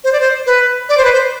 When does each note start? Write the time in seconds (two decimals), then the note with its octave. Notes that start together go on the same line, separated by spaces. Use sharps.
0.04 C5
0.13 D5
0.20 C5
0.46 B4
0.89 D5
0.98 C5
1.04 B4
1.13 C5